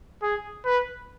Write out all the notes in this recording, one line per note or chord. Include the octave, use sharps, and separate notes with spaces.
G#4
B4